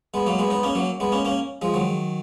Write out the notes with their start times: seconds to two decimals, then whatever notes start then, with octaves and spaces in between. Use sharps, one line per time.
0.14 G#3 B3
0.26 F#3 A#3
0.39 G#3 B3
0.50 B3 D#4
0.63 A#3 C#4
0.75 F#3 A#3
1.00 G#3 B3
1.12 A#3 C#4
1.25 A#3 C#4
1.62 F3 G#3
1.74 D#3 F#3